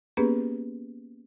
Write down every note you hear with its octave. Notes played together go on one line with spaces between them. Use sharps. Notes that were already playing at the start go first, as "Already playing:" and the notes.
A#3 B3 C#4 G4 G#4 B4